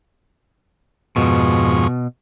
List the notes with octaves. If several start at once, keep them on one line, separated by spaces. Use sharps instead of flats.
F2 G#2 B2 C#6